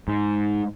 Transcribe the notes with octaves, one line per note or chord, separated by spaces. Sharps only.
G#2